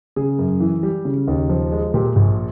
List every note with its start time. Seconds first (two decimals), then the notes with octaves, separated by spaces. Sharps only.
0.16 C#3 G#4
0.39 F#2
0.60 E3
0.83 G3
1.05 C#3
1.28 D#2
1.49 F3
1.72 G#3
1.94 A#2 G4
2.16 A#1